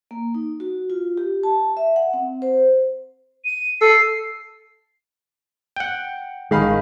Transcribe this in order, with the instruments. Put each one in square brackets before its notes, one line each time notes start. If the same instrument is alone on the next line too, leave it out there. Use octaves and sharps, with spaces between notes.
[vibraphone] A#3
D#4
F#4
F4
G4
A5
E5
F#5
C4
C5
[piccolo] D#7
[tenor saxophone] A4 [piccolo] C7
[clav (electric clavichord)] F#5 G5
[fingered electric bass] A1 G#3 [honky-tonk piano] D#3 [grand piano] G#4 F5 B5